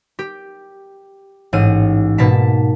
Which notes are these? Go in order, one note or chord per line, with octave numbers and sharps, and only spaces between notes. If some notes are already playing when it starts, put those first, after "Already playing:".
G4
A1 G#2 F6 D#7
G#2 B2 A#3 A5 B6